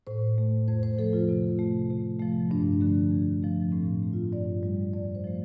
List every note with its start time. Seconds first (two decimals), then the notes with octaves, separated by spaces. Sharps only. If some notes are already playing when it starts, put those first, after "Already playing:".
0.07 A2 C5
0.38 A3
0.68 F2 C5
0.83 C5
0.98 F3 A3 A4
1.13 F4
1.29 C3
1.59 A3
1.90 C3
2.20 F3 A3
2.50 G2 D4
2.81 D3 F3 A3
3.11 F2
3.42 F3 A3
3.72 A2 C4
4.03 A3
4.13 F4
4.33 G2 D5
4.63 G3
4.93 F2 D5
5.15 C5
5.25 F3 A3